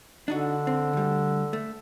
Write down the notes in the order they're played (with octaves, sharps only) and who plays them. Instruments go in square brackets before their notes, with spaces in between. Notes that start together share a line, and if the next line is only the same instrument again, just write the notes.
[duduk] D3 [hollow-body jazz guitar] D4 D#4 F#4
[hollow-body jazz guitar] C4
D2 G3
A3